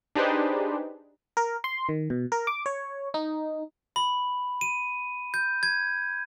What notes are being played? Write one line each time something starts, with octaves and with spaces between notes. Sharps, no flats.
D4 D#4 G4 G#4 B4 C5
A#4
C6
D#3
B2
A#4
D6
C#5
D#4
B5
D#7
G6
G#6